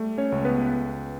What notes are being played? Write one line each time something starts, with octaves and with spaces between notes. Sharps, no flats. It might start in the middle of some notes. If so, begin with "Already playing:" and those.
Already playing: G3 A3
C#4 C#5
C#2
B3 B4